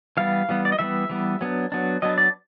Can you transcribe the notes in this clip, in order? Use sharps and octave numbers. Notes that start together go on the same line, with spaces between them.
E3 G3 B3 F5
E3 G3 B3
D5
D#5
E3 G3 B3 E5
E3 G3 B3
F#3 B3 D4
F#3 B3 D4
F#3 B3 D4 D#5
D5